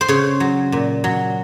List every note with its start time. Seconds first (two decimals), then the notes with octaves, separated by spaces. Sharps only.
0.01 C5
0.08 C#3 C#5
0.40 F#3
0.72 A#2
1.04 F#3